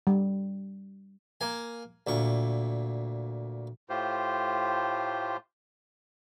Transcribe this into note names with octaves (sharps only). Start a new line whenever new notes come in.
G3
A#3 G#5
D2 A#2 C#6
A2 A3 F4 G4 C5